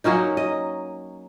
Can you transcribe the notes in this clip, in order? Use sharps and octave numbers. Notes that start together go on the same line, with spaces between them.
F#3 A#3 C#4 D#4
D#5